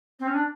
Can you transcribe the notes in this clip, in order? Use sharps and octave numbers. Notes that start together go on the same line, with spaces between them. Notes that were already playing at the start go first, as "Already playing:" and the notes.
C4
C#4
D4